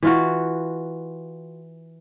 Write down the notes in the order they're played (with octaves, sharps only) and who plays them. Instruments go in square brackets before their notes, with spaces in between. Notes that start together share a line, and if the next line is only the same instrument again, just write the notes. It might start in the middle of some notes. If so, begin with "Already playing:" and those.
[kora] E3 F4 F#4